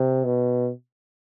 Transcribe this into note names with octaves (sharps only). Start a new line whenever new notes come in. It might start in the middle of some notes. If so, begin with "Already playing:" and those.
Already playing: C3
B2